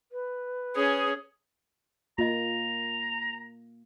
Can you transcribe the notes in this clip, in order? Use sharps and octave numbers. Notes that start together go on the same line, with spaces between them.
B4
C#4 G#4
A#3 F4 D#5 A#5